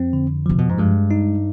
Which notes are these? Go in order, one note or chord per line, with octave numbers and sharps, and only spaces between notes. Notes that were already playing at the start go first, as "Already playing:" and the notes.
Already playing: F2 C4
D3
C3 F3
B2
G#2
G2 G#3
D#4